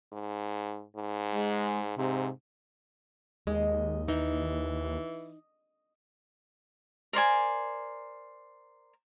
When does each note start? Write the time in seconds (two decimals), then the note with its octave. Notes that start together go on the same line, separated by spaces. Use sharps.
0.12 G#2
0.96 G#2
1.34 G#3
1.98 G#2 C3
3.47 D#2 G#3 D#5
4.08 E3 D#4
7.13 A#4 C5 D5 G#5